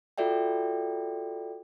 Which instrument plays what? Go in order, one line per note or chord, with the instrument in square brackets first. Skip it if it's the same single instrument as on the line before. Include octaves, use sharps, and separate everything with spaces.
[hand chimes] F4 F#4 A4 D5 E5 G5